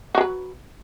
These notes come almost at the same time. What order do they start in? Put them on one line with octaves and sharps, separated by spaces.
F#4 F#3 B4